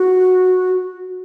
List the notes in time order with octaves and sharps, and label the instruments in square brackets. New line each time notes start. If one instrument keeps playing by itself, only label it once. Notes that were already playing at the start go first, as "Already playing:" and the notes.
Already playing: [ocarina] F#4